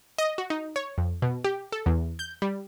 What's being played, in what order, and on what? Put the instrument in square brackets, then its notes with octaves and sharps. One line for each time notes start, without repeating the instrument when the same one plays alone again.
[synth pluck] D#5
F#4
D#4
C#5
F2
B2
G4
A4
E2
G6
G3